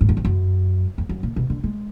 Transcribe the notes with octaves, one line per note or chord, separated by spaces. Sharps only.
G#2
F#2
F2
F#2
F2
F#2
A#2
B2
D3
G#3